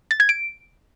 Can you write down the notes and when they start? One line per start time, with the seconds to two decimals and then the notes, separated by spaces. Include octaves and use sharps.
0.11 A6
0.20 G#6
0.29 D7